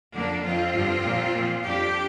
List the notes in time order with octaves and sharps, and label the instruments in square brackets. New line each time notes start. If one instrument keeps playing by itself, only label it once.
[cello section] F2 D3 F3 A#3 D4
F2 F3 C4 F4
G2 D3 F3
A#2 F3
A#2 F3
F2 F3 D4 G4